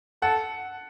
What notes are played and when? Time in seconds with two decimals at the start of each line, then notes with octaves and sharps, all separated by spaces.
0.22 A4 F#5